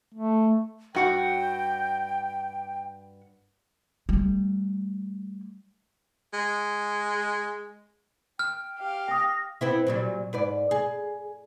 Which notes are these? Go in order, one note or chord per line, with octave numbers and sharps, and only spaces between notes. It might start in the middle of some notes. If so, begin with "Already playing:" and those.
A3
G2 F#4 F#5 G5
G3 A3
G#3
G5 F6
G4 F5
G5 D#6 A#6
B3 C4 E4
A#2 F#3 G3
G#2 B4 D5
G#4